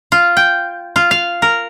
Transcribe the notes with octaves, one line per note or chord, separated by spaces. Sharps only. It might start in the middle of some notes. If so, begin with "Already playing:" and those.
F4
G5
F4
F5
A#4